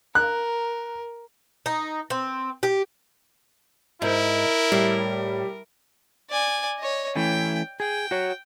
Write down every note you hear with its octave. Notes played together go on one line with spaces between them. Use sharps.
A#4 F#6
D#4
C4
G4
G#2 E4 A#4
A2 G3
D5 G#5
C#5 D#5
E3 A3 C#4 G5
G#4 G5
F#4 C#5